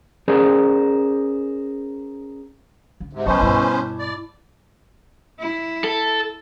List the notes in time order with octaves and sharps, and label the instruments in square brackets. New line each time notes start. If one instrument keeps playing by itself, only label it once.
[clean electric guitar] C#4 G#4 A#4 C5 D5
[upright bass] D3
[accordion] G#2 C3
[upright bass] F#2 C#3 [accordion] B3 C#4 C5 [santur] D#5 A5 C#6
[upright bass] G2 B2 [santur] E4
[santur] D6
[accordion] D5
[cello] E4
[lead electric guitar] A4